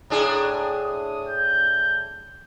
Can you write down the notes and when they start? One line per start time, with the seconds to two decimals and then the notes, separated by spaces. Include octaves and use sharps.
0.10 A2 D4 G#4 A#5
0.82 D#6
1.29 G6